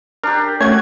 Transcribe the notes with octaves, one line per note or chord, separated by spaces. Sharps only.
D4 G4 A#4
A3 C#4 F#4 C#5 G#6